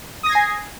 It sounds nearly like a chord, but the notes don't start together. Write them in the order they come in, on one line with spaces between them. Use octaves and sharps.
D#6 A#6 G#6 C7 G#5